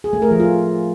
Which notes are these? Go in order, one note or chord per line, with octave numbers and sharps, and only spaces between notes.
G#4
A3
A#4
F3
F4